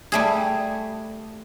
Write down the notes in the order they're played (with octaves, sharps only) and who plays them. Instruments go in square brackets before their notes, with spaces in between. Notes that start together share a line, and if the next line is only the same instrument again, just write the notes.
[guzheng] G3 A3 G#4